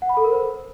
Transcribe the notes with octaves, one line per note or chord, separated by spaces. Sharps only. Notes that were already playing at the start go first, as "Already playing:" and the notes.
F#5
B5
A4
A#4
C5